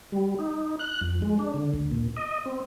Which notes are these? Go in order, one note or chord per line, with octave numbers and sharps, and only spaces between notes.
G3
D#4
F#6
F2
G#3
D4
D3
D2
A#2
D#5
C4